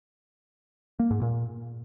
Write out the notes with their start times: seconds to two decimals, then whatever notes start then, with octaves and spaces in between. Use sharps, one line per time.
1.00 A#3
1.11 G#2
1.22 A#2